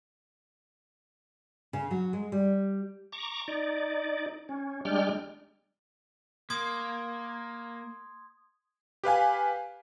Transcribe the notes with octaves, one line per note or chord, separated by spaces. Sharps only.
C#3
F#3
G#3
G3
A#5 C#6 D6
D#4 D5
C#4
G3 G#3 D4 G5 F6
A#3 C6 D#6 G#6
G4 B4 F5 G#5